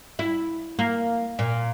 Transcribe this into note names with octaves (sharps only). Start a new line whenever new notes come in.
E4
A#3
A#2